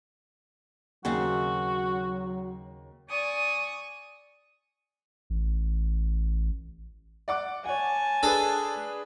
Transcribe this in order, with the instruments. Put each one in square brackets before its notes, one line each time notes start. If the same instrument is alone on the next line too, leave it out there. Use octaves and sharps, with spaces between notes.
[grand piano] D#2 [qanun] C#3 C4 D#4 [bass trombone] F#3 [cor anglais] F#4
[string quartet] D5 G#5 C#6 D#6
[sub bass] A1
[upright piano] D5 F#5 D6
[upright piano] C#5 F#5 [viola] G#5 A5
[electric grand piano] D4 G#4 B4 [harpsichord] A4